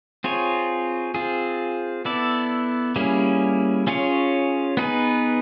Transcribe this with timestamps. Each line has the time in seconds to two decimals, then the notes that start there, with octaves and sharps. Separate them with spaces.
0.24 C4 F4 G#4 C#5
1.15 C4 F4 G#4
2.05 B3 E4 A4 D5
2.96 G3 A#3 C#4 E4 G#4
3.87 C#4 F4 G#4 C#5
4.77 B3 D#4 G#4 B4